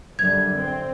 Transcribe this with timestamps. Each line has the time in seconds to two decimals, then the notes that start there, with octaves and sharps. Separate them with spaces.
0.19 F#2 D3 G3 G#6
0.56 C4